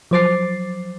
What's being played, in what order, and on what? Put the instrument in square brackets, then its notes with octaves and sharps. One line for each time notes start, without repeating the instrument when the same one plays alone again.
[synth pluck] F3 F#3 C5 D6 A6 C7